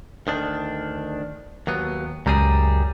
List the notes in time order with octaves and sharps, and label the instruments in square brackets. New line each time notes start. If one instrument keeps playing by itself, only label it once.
[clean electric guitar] D2 D#3 D4
D#2 F#3 B3
[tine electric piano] C#2 A#5 [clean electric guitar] F#2 G3 G#4